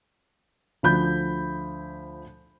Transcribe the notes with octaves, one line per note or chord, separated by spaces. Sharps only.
D2 F3 B5 G6